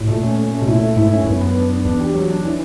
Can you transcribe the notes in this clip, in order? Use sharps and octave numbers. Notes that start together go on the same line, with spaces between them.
A2
A#2 A3
C#4
C#4
A3
B2
A#2 E4
A3
G#2 E4
C#4
G2
F#2 B3
B3
D4
B3
E2 D4
G4
F#3
D4
E3